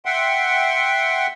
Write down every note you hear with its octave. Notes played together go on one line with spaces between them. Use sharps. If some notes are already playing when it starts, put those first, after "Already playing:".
E5 F#5 G5 C6